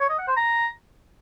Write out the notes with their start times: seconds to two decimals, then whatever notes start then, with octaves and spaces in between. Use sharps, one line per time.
0.01 C#5
0.10 D#5
0.19 F#5
0.28 C5
0.37 A#5